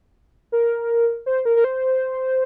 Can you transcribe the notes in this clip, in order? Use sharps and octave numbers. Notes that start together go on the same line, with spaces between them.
A#4
C5
A#4
A#4
C5